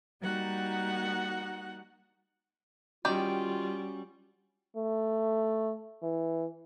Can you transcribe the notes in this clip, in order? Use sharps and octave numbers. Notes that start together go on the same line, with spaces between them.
G3 A#3 D#4 F#4 F#5
D#3 G3 C#4 F4 F#4 D5 G5
A3
E3